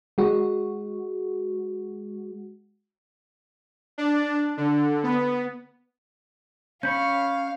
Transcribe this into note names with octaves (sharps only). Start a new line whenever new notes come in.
G#3 F#4
D4
D3
B3
C#4 F5 B5 C#6 G6